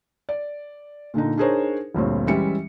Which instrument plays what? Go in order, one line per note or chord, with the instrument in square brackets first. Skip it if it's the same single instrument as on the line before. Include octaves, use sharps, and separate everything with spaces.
[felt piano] D5
A#2 D3 D4 D#4
D4 D#4 G#4 A#4 C5 C#5
G1 D2 G2 A#2 C4 C#5
E3 G3 G#3 C#4 E5 C#7